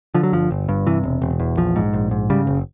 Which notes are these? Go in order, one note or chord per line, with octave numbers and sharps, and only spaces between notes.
D3 F3
F#3
G1 F3
G1
G2
C3 E3
E1
E1
E2
A#1 F3
G#2
A#1
G#2
C#3 G3
F#1